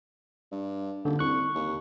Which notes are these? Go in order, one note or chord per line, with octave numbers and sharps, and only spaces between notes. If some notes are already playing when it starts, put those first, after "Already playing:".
G2
D#1 D3
C2 C#6 F#6
D#2